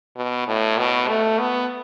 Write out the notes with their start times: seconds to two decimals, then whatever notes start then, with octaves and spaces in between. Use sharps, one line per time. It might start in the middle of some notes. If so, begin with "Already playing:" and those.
0.17 B2
0.48 A2
0.78 B2
1.09 A3
1.39 B3